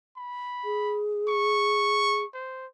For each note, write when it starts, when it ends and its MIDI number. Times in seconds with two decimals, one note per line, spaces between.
0.17 1.00 83
0.64 2.24 68
1.29 2.27 85
2.34 2.67 72